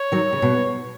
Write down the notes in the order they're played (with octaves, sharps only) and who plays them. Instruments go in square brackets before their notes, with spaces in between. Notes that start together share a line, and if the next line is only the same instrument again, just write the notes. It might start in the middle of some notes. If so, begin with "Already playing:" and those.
Already playing: [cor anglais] C#5
[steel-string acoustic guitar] D#3 F#3
C#3
B2